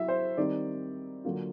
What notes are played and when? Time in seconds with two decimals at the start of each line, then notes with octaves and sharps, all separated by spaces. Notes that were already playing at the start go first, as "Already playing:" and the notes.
Already playing: F#3 E4 E5
0.08 C5
0.37 D#3 G3 C4 D#4 D5
1.25 D3 F#3 A#3 D4 F4